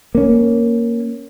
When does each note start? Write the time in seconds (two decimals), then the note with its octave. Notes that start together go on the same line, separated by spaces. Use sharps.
0.15 A#3 C#4